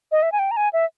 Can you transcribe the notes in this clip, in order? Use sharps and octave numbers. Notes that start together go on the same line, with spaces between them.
D#5
E5
G#5
G5
A#5
G#5
E5